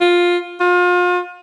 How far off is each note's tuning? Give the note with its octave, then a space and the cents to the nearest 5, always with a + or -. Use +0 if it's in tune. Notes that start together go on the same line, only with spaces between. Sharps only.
F4 +10
F4 +35